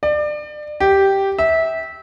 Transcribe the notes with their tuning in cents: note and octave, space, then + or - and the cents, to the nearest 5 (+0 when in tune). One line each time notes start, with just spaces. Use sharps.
D5 +30
G4 -5
E5 -20